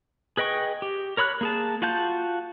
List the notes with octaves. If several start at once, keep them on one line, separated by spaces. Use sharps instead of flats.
G#4 B4 D#5 G5 C#6
G4
A#4 C#5 B5 E6 F#6
A#3 G#4 A5
F4 F#4 F5 A5 G6